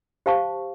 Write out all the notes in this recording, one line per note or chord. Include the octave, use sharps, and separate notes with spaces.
G4 C5 F5 A5 C#6